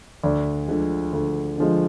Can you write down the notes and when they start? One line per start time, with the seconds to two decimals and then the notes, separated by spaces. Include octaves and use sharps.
0.23 D2 D5
0.68 D3 F3 G#3
1.13 D2
1.58 D3 F3 G#3